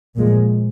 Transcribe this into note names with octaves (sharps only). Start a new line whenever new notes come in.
A#2 F3 G#3